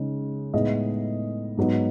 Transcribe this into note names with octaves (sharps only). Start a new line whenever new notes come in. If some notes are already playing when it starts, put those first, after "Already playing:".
Already playing: C#3 G#3 D#4
A2 G#3 B3 D#4 D#5
G#2 F#3 B3 D#4